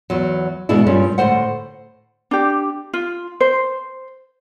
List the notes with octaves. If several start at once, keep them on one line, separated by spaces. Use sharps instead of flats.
E2 F#3
E2 B2 G#3 D4 E4
G2 A#2 G3 C#4
D2 A2 G#3 C5 F#5
D4 G4
F4
C5